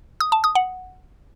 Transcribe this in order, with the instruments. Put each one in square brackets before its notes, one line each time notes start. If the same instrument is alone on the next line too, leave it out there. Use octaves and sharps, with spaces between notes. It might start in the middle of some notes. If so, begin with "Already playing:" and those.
[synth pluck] D#6
A5
D#6
F#5